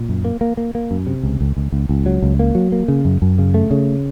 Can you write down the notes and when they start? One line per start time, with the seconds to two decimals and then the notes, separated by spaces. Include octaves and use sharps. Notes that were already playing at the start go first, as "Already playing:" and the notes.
Already playing: A#2
0.09 F#2
0.25 A#3
0.41 A#3
0.57 A#3
0.75 A#3
0.91 F#2
1.07 C3
1.23 C#2
1.41 C#2
1.57 C#2
1.72 C#2
1.89 C#2
2.06 F#3
2.22 C#2
2.39 A#3
2.55 F#3
2.72 A#3
2.88 C#3
3.05 F#2
3.22 F#2
3.38 C#3
3.54 A3
3.71 C#3